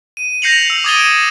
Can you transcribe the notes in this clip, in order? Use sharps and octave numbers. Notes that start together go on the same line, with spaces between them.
D#7
G6 A#6 C7 C#7 F7 F#7
E6
D6 D#6 G#6 A6 D#7 G7
D7 E7